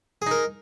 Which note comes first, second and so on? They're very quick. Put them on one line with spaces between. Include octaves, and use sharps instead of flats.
G#4 D#4 A#4